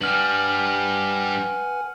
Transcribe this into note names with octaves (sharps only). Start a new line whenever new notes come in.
G2 G3 B4 F#5 G#5 F6 F#7